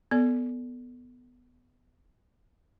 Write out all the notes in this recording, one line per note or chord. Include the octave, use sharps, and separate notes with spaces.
B3 A4 D5